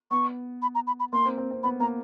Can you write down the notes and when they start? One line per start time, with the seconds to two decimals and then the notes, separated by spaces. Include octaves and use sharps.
0.11 B3 C#6
0.62 B5
0.75 A#5
0.87 B5
1.00 B5
1.13 A#3 C6
1.26 C4
1.38 C4
1.51 C4
1.63 B3 B5
1.80 A#3 A#5